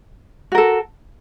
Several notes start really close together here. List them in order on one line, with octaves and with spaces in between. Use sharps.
F#4 A#4 A4